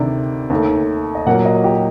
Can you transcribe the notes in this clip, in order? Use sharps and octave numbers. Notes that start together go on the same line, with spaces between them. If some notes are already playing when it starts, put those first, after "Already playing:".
Already playing: D2 C3 D#3 D5
D#2 D#3 A3
D#5
A#2 F#3 A#3 F#5
D#5
G4